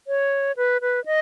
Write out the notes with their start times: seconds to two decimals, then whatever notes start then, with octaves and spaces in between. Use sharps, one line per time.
0.07 C#5
0.57 B4
0.81 B4
1.06 D#5